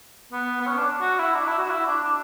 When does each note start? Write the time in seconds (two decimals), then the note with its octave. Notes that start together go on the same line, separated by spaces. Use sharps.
0.32 B3
0.61 B3
0.67 C#4
0.78 D4
1.01 F#4
1.19 E4
1.35 D4
1.47 E4
1.58 F#4
1.70 E4
1.86 D4
2.04 D4